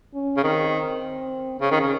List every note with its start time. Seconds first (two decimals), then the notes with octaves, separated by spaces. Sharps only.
0.14 C#4
0.37 C#3
0.44 D#3 C4
1.61 C#3 C#4
1.71 D#3
1.81 C#3